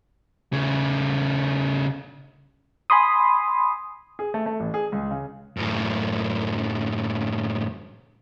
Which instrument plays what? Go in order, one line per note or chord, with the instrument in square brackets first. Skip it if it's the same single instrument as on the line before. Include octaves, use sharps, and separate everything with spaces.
[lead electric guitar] C#3 A3
[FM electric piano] G#5 B5 C6 D#6
[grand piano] G#4
A3
A3
A1
G#4
C#2
C#3
[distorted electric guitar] F#2 A2